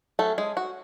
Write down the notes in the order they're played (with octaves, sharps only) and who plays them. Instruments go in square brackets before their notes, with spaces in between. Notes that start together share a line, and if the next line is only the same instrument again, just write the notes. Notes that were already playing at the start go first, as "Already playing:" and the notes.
[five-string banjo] F#3 A3 C#4 A4
G#3 G#4
F#4